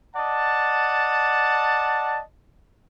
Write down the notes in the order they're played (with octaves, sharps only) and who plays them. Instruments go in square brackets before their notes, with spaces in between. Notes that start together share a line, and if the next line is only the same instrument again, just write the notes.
[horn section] D5 D#5 F#5 A5